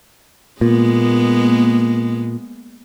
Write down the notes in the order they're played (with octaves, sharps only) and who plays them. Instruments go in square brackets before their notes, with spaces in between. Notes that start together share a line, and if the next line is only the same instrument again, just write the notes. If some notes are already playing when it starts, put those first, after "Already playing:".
[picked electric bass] A#2 [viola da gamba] G#3 A#3 B3